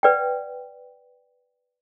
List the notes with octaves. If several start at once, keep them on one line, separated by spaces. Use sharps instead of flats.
B4 D5 F#5 G5